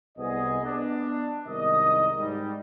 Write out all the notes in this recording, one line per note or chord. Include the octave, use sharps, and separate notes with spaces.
C2 B3 G#4 D#5
B3 D4
C2 G#2 D#3 A#4 D#5
G#2 G3